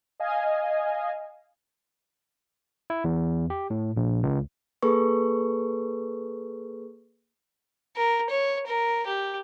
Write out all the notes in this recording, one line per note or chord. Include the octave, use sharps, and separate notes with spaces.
D#5 F5 G#5
E4
E2
G4
A2
A#1
C#2
A#3 G#4 A4 B4 C#6
A#4
C#5
A#4
G4